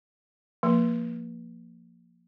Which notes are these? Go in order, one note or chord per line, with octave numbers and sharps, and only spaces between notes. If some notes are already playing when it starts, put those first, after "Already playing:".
F3 A#3